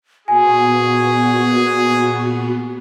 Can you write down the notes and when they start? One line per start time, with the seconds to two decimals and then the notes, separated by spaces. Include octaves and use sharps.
0.28 A#2 B3 F#4 G#4 G#5